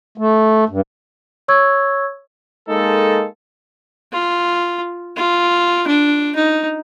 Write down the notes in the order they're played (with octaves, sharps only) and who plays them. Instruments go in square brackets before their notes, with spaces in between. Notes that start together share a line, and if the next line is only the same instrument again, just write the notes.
[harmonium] A3
G2
[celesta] C#5 C#6 E6 G#6
[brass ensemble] G#3 A#3 D#4 A4
[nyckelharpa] F4
F4
D4
D#4